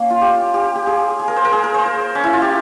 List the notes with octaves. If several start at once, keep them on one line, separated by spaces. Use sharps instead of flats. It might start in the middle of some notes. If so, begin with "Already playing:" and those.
Already playing: A#3 C#4
F4
G4
G4
G4
G#4
G#4
A#4
C5
A#4
G#4
A#4
C5
C5
C#4
E4
F4
G4